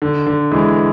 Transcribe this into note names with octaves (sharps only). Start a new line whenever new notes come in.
D3
D3
E3 G#3